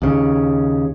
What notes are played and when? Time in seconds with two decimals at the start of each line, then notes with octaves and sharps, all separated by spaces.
0.02 D#2 C#3